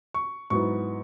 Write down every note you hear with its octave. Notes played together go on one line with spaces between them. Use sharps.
C#6
G#2 F#3 B3 E4 C#6